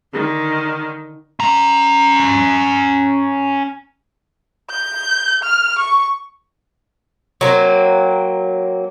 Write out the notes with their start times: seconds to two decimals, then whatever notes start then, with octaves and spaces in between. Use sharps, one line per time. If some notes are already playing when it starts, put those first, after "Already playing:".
0.12 D3 D#3
1.40 C#4 A#5
4.70 G6
5.44 F6
5.79 C#6
7.41 F#3 A#3 C4